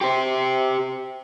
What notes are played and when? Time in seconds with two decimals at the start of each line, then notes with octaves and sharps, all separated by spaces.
0.01 G4 C5